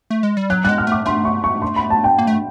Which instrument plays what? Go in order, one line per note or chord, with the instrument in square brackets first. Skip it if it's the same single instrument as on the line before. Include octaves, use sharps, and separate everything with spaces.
[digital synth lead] A3
G#3
G3
[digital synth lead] F#3 [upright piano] F#6
[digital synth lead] G3 [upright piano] F#6
[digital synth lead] G#3
[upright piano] F6
[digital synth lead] A3 [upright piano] D6
[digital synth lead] A3 [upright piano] C6
[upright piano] C#6
C#6
C6
B5
A5
G5
[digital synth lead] A#3
A3